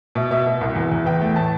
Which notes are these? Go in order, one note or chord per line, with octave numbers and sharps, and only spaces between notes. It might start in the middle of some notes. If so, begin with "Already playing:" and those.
B2 E5
B2 E5
B2
C2
E2
E2
E2 G5
A3
A2 A5